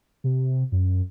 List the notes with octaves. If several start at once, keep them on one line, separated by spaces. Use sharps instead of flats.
C3
F#2